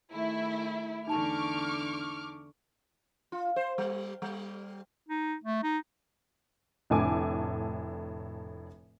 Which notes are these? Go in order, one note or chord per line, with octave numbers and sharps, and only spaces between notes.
D#3 A3 E4 G#4
E2 D3 D#4 A5 C#6 D6 F6 F7
F4
C5
G3
G3
D#4
A3
D#4
F1 A2 D3 A4 G#5 D6